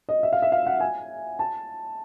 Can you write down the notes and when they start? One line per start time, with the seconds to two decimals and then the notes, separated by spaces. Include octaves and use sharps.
0.09 D#5
0.23 E5
0.32 F5
0.42 E5
0.52 F5
0.66 F#5
0.80 G#5
1.39 A5